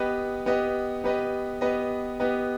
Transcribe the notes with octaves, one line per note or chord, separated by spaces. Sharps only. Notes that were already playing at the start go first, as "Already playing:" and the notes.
Already playing: B3 G4 B4 D#5
B3 G4 B4 D#5
B3 G4 B4 D#5
B3 G4 B4 D#5
B3 G4 B4 D#5